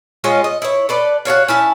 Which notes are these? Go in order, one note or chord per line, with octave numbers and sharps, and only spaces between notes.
G#3 C#4 F4 D#5
D#5
E4 C#5
A4 B4 D5
F#4 A4 C#5 F5
C#4 E4 A5